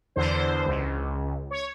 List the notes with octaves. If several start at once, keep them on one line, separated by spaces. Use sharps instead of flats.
E2 D3 C5
C#2
C#5